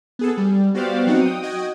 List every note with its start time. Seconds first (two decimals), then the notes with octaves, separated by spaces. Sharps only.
0.19 B3 G#4 A4
0.37 G3
0.74 B3 F#4 G4 C5 D5 F5
1.07 F#3 C4 D#4 F#4 F#5
1.22 G5 D#6
1.43 F#4 D#5 G5 G#6